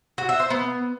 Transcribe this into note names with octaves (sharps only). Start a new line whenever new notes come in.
F#4
E5
C5
B3